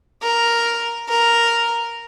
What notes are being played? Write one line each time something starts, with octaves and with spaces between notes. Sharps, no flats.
A#4
A#4